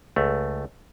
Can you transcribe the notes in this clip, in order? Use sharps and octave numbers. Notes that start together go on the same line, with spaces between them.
C#2 A3